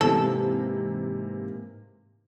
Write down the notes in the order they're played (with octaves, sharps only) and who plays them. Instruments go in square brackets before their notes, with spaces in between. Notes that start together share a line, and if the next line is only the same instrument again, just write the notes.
[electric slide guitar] G#2 A#3 [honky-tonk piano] C3 E3 [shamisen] A4